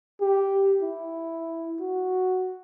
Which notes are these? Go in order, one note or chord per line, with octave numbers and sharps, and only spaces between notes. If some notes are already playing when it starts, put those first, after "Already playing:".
G4
E4
F#4